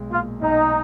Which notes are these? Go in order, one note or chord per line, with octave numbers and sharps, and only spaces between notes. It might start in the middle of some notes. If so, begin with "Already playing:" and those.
Already playing: B1 G#3
A#2 F4
B1 D#4